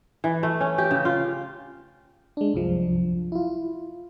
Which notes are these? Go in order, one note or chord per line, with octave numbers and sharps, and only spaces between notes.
E3
A3
C#4
G4
C#3
F4
G#3 D4
C2 F#2 F3
E4 F4